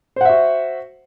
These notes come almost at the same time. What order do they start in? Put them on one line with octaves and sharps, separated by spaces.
C5 F#5 E5 F#4